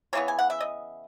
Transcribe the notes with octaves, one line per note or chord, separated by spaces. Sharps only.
C#3 E3 B3 C#5
G#5
F#5
E5
D#5